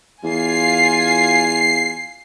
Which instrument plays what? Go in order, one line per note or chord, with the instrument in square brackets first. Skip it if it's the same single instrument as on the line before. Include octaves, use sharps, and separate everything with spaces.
[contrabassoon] E2 [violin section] F4 G#5 [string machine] C7